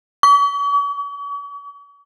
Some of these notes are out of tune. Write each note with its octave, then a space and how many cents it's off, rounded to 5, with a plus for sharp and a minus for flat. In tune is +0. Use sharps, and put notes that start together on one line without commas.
C#6 +45